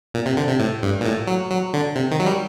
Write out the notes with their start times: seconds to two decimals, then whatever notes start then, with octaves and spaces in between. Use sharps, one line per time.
0.14 A#2
0.26 C3
0.37 D3
0.48 C3
0.59 A2
0.83 G2
1.01 A#2
1.05 A2
1.27 F#3
1.51 F#3
1.74 D3
1.96 C3
2.11 D#3
2.20 F#3
2.26 G3